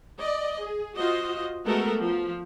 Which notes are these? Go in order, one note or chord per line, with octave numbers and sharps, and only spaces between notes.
D5 D#5
G#4
F4 F#4 C5 D#5
G#3 A3 B3 F#4 A4 A#4
F3